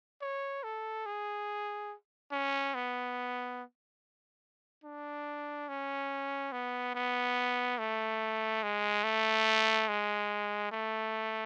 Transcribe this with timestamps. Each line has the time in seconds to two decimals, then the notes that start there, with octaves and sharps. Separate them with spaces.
0.22 C#5
0.64 A4
1.06 G#4
2.32 C#4
2.75 B3
4.84 D4
5.69 C#4
6.52 B3
6.95 B3
7.79 A3
8.63 G#3
9.04 A3
9.89 G#3
10.72 A3